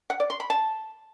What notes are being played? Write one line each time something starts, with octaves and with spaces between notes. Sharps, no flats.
F#5
D5
C6
B5
A5